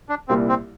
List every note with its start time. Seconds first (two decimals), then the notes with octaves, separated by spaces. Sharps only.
0.09 D4
0.28 C2 A#2 G3 A#3 C4 E4
0.49 C4